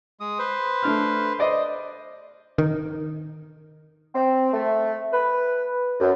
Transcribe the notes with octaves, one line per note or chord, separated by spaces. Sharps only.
G#3 D#6
B4 C5
A3 D4 F6
C5 D5 D#5
D#3
C4
A3
B4
F#2